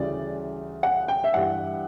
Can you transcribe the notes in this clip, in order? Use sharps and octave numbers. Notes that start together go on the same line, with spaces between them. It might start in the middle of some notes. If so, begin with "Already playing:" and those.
Already playing: D2 C#3 E3 G3 D5
F#5
G5
E5
G2 E3 G3 F#5